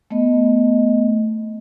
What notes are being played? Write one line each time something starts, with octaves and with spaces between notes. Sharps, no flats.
A3 B3 D#5